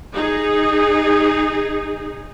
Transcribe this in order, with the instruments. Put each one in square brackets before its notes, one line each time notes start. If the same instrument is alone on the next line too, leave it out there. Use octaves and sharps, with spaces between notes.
[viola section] D#4 G#4